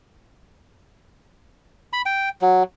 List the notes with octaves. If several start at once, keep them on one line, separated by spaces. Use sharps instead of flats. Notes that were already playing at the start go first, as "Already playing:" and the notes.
B5
G5
F#3